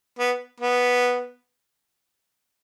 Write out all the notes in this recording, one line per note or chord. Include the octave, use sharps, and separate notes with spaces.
B3
B3